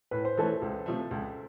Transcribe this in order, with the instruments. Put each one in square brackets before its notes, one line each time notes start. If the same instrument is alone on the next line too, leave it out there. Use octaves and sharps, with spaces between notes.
[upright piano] A2 [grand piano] B4
[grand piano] C5
[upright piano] E3 A3 C#4 [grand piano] A4 B4
[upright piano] C#2
C3 F3 A3
C#2